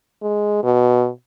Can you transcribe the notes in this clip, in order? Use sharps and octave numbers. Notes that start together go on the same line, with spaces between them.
G#3
B2